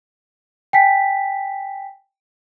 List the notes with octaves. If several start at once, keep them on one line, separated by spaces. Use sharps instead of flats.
G5 G#5 B6